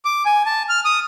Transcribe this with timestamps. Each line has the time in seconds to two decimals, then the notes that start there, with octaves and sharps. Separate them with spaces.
0.05 D6
0.26 G#5
0.46 A5
0.69 F6
0.85 D#6